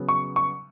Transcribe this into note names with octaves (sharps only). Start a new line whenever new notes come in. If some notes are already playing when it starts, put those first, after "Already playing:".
Already playing: C#3 F#3 B3
C#6
C#6